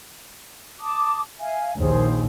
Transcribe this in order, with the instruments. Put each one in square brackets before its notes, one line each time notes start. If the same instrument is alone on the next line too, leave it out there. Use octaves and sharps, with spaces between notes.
[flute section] A5 D6 D#6
E5 F5 G#5
[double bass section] A#1 D#2 [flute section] G#4 C5